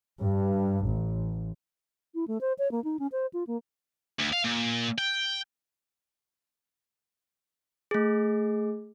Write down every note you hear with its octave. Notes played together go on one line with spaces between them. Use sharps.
G2
A1
E4
A3
C5
C#5
A#3
D#4
C#4
C5
F4
A#3
D2
F5
A#2
G5
A3 G#4